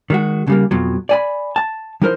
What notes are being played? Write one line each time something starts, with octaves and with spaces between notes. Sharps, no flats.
D#3 G#3 F#4
C#3 G3 A#3
F2 B2 F3 F#3
D5 G#5 B5
A5
F3 D#4 E4 A#4 C5